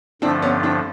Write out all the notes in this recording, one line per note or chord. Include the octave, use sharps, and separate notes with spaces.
G2 D3 F3 A3 C4 D4
B3 C#4
C4 D4